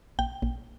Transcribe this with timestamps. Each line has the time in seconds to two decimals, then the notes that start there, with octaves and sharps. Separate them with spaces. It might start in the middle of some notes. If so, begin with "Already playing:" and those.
0.19 A#1 G5
0.42 A#1